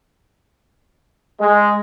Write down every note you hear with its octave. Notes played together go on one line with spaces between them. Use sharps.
G#3